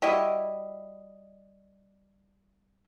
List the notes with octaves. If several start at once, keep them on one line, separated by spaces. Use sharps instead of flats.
G3 E4 F#4 D#5